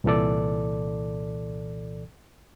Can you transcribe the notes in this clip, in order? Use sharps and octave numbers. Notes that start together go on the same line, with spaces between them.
C2 A#2 E3 A4 D5